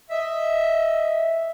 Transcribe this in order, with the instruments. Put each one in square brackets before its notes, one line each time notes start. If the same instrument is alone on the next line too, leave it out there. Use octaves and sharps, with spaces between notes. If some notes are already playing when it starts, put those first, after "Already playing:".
[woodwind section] D#5 E5